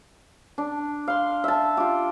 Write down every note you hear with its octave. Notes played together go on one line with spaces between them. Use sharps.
D4
F5 C6
E5 A5
F4 G4